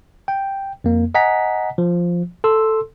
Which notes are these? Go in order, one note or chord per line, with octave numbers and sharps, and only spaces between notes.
G5
F2 A#3
D#5 F#5 G#5 A#5 B6
F3
A4 C6 E6